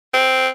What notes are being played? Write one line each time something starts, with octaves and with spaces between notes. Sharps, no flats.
C4